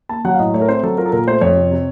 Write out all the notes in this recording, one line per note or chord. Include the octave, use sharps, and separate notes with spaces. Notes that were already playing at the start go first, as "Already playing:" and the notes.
A#3 A5
F#3 F#5
F5
A2 D#5
A3 C#5
A#4
C4 C5
F#3 A4
F4 A#4
A4
A#2 A#4
A3 C5
F2 C#5
C3
C3